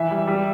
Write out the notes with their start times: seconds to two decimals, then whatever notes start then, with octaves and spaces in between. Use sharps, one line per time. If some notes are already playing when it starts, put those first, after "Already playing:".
Already playing: E3 E5
0.11 G3
0.27 G3